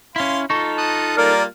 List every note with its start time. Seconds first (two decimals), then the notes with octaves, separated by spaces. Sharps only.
0.16 C#4 E4 F5 C6
0.50 D#4 F4 A4 C#6
0.78 A5 D#6 F#6
1.17 G3 A#3 F4 A#4 D5 F6